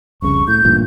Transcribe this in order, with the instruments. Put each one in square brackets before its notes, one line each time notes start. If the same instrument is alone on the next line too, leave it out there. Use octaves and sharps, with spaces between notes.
[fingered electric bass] F1 C2 C#3 [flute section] C#6
[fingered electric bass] A2 [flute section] G6
[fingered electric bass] A1 G2 A#2